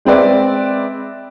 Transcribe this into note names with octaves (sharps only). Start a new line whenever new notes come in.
G#3 C4 B4 D5 E5